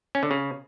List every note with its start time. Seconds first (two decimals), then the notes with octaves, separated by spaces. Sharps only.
0.15 C#4
0.23 D3
0.31 C#3